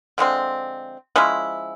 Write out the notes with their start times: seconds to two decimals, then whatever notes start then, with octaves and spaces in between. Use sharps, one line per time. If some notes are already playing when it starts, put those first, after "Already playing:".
0.18 D3 F3 G#3 C4
1.16 F3 G#3 C#4 E4